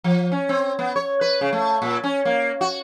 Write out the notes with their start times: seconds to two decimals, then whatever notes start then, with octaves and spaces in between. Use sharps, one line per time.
0.04 F3
0.32 C#4
0.49 C4
0.79 B3
0.96 C#5
1.21 B4
1.41 C#3
1.53 A3
1.82 A#2
2.04 C#4
2.25 A#3
2.61 F#4